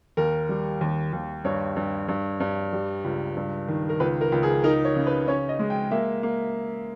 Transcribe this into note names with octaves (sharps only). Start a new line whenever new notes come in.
D#2 A#4
G3
D#2
D#2
G2 C#5
G2
G2
G2
G3
C#2
G2
D#3
A#4
C#2 B4
A#4
C#2
G#4
D#4 A#4
C#5
C#3
B4
C#4 C#5
D#5
G#3
G5
A#3 E5
A#3